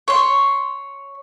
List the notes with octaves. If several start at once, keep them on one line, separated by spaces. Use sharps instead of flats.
C#5 C6